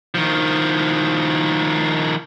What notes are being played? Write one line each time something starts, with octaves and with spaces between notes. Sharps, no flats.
D#3 F3